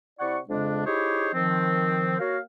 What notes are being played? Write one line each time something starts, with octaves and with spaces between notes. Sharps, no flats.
C3 E4 D5 F#5 C#6
F2 C#3 G#3 D4
D#4 E4 G4 G#4 C5 C#5
D#3 F3 C4
A#3 F#4 A#4 C#5 F5